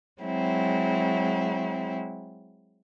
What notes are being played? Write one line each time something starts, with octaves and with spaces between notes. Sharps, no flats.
F#3 G#3 C4 E4